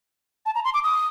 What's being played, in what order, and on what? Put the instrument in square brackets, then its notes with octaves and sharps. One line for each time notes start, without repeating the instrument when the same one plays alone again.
[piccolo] A5
A#5
C6
D6
D#6